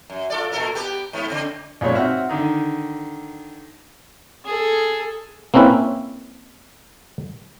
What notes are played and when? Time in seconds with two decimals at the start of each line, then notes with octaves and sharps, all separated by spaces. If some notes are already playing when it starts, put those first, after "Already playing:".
0.10 F#2
0.30 F4 A4 D5
0.52 A#2 A4 A#4
0.75 B3 G4
1.13 G#2 B3
1.28 C#3 C4
1.81 B1 A#2 G#3 C#4 C#5
1.95 C4 F#4 E5 F#5 F6
2.29 D3 D#3 D#4
4.45 G#4 A4
5.54 A#3 C4 C#4 E4 B4